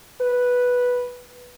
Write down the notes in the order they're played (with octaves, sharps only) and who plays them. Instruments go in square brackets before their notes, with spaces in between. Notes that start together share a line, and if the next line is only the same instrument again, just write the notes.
[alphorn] B4